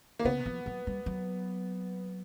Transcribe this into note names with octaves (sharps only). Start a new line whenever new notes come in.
A#3
C#3 B3
F3
F#3
G3
F#3